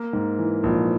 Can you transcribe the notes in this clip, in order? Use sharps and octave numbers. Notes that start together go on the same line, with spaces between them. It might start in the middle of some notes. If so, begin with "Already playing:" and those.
Already playing: A#3
G#2
E3
A#1